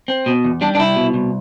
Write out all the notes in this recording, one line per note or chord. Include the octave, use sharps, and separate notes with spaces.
C4
B2
E2
G3 D4
D4
C2 E4
B2
C2